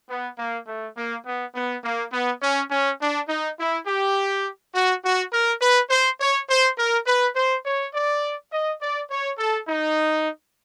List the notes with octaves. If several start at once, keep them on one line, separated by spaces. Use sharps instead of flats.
B3
A#3
A3
A#3
B3
B3
A#3
B3
C#4
C#4
D4
D#4
E4
G4
F#4
F#4
A#4
B4
C5
C#5
C5
A#4
B4
C5
C#5
D5
D#5
D5
C#5
A4
D#4